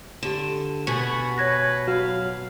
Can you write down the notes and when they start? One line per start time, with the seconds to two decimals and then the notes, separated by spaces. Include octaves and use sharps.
0.23 D3 G4 E7
0.87 B2 F#4 G#5 B5 C#6
1.38 B4 C#5 G#6 A#6
1.88 F#3 F#4 F5